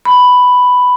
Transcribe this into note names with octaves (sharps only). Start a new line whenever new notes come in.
B5